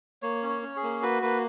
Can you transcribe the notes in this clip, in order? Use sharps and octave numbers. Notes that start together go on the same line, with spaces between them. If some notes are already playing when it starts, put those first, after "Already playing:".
A#3 C#5
C#4
C#5
C#4
G#4
A#3
F#4 B4
A#3 B4